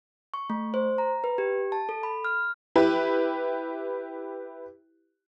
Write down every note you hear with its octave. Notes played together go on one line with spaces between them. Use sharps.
C#6
A3
C5
A#5
B4
G4
A5
A4
B5
F6
E4 G4 B4